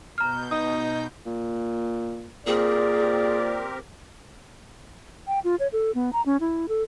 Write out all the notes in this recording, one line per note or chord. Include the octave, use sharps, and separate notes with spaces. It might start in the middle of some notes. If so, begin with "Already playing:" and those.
B2 A#5 F6 G6
D#4 D#6
A#2
A#2 C4 G4 G#4 A#4 D5
G5
F4
C#5
A4
B3
A#5
C#4
E4
A4